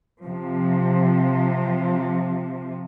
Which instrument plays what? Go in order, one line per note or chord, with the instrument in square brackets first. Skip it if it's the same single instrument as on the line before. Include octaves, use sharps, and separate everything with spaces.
[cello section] C3 F3